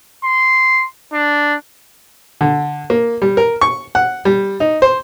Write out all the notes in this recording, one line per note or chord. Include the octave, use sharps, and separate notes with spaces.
C6
D4
D3
A#3
G3
A#4
C#6
F#5
G3
D#4
C5